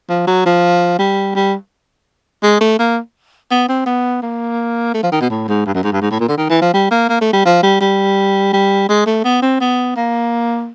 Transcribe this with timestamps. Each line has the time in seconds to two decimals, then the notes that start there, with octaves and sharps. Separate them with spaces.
0.09 F3
0.27 F#3
0.46 F3
0.99 G3
1.35 G3
2.43 G#3
2.60 A3
2.79 A#3
3.51 B3
3.68 C4
3.86 B3
4.22 A#3
4.94 A3
5.03 F3
5.12 D#3
5.21 B2
5.29 A2
5.48 G#2
5.66 G2
5.74 F#2
5.83 G#2
5.92 G2
6.01 G#2
6.10 A2
6.20 A#2
6.28 D3
6.37 D#3
6.49 E3
6.61 F3
6.73 G3
6.91 A#3
7.09 A#3
7.21 A3
7.33 G3
7.45 F3
7.63 G3
7.81 G3
8.53 G3
8.89 G#3
9.06 A3
9.24 B3
9.42 C4
9.60 B3
9.96 A#3